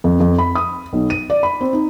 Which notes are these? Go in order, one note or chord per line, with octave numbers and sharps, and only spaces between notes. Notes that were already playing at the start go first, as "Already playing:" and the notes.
F2
F2
B5
D#6
B1
D#7
D5
B5
C4
D#4